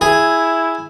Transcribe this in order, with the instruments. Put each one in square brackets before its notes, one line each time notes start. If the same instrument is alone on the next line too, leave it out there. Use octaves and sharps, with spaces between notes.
[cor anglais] E4 [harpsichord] G#4